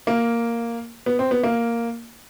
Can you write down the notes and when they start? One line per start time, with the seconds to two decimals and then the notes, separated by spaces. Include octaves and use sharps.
0.07 A#3
1.06 B3
1.19 C4
1.31 B3
1.44 A#3